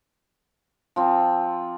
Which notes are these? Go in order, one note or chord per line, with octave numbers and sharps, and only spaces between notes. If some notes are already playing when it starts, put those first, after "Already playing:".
F3 C4